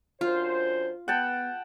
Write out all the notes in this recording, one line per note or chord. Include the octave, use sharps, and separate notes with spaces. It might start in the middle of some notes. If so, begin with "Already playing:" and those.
F#2 D4 F4 C5
B3 F#5 G5 A5